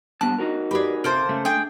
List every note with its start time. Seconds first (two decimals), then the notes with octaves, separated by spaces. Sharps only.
0.21 G2 B3 D4 A5 F#6
0.38 D#4 F#4 A#4
0.71 G4 G#4 B4 D5 B5
1.04 C3 A#3 A4 C5
1.29 C#3 A3
1.45 D4 G#4 G5